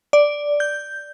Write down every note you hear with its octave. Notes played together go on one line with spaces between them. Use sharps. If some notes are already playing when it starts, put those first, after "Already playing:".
D5
G6